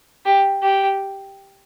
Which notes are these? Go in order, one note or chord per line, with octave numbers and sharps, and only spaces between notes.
G4
G4